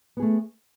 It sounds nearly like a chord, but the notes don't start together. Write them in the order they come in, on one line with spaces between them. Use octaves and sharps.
B3 G#4 A3